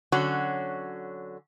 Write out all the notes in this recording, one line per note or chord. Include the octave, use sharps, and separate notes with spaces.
D3 F#3 C#4 F#4